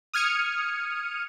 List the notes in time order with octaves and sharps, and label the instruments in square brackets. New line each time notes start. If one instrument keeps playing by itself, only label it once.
[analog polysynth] D#6 F6 G#6 C#7 D#7